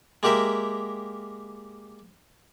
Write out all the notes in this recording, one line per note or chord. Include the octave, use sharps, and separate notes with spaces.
G#3 A#3 G4 A#4 E5